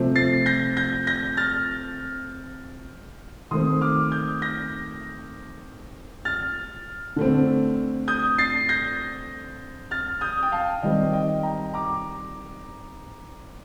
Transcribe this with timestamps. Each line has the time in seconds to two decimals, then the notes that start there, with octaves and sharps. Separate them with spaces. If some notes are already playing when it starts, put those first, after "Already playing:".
Already playing: C3 F3 A3 C4
0.16 A6 C7
0.46 G6 A#6
0.77 G6 A#6
1.07 G6 A#6
1.37 F6 A6
3.51 D#3 A3 C4 C6 D#6
3.81 D6 F6
4.11 D#6 G6
4.42 G6 A#6
6.25 F6 A6
7.16 D3 A3 C4
8.08 D#6 G6
8.38 A6 C7
8.69 G6 A#6
9.91 F6 A6
10.21 D#6 G6
10.43 G5
10.52 F5 A5
10.83 D#3 G3 C4 D#5 G5
11.13 D#5 G5
11.43 G5 A#5
11.74 A#5 D6